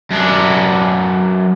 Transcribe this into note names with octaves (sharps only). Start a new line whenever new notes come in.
F#2 D4